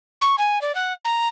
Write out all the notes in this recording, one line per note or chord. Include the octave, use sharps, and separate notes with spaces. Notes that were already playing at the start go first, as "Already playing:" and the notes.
C#6
G#5
D5
F#5
A#5